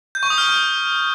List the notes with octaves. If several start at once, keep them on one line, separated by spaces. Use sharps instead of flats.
G6
C#6
D#6
F6